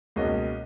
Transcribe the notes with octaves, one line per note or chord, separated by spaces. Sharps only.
C#2 B2 A#3 C#4 D#5